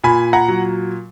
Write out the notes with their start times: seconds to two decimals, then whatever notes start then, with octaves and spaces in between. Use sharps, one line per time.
0.04 A#2 G#5 B5
0.33 F#5 A#5
0.48 F#3